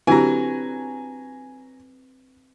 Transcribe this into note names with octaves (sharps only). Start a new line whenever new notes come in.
D3 F#3 C4 E4 G4 B4 G#5 A#5